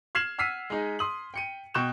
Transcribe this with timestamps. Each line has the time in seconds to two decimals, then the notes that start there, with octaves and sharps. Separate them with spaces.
0.15 F6 G#6 C7 E7 F#7
0.38 F#5 E6 F6 B6 C7 D#7
0.70 G#3 D#4
0.99 C6 D#6 F#7
1.34 G5 C#7 D#7
1.74 B2 G5 C#6 F#6 G6 E7